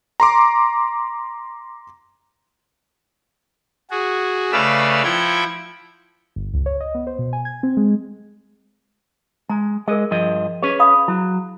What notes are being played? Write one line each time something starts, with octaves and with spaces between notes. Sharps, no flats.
A#5 C6 D6
F#4 G#4
C#3 A3 B4 D5 F5 E6
F3 E4 F#5 G5 G#6
G1
C#2
C#5
D#5
B3
C5
B2
G#5
G#6
C4
G#3
G#3 A#5
G#3 G#4 A#4 D#5
G2 F3 D#5
C#4 G#4 B4 C#5
F5 B5 D#6
F#3 E4